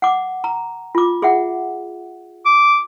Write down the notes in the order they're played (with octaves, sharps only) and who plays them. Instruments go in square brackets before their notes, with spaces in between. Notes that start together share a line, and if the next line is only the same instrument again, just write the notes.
[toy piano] F#5 D6
A#5
F4 D6
G#4 E5 F#5
[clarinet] D6